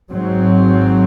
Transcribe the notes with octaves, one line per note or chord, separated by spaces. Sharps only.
G#1 G#2 F#3 C4